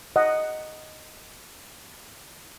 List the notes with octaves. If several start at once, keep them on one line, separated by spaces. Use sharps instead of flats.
D#5 F#5